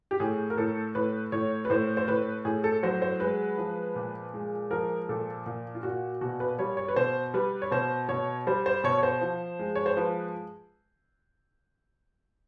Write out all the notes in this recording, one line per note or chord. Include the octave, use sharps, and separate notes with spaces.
G4
A2 G#4
A#4
A2 A4
A2 B4
A2 C#5
B4
A2 C5
C5
A2 B4
A2 G#4
A4
F#3 C5
C5
G#3 B4
F3
A#2
G#3
F3 A#4
A#2 A4
A#2
F4
A#2 F#4
B2 F#4
B4
G3 C#5
C#5
B4
B2 C5
G3 B4
C#5
B2 C5
B2 C#5
G3 C5
C5
B2 C#5
C#5
C5
F3
G#3
C#5
C5
F3 B4